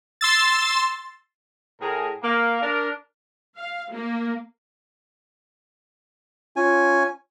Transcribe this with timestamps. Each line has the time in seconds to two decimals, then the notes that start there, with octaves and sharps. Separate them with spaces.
0.21 C6 E6 A6
1.81 A2 G#4 A#4
2.23 A#3
2.61 D4 A#4
3.58 F5
3.92 A#3
6.56 C#4 F4 G#5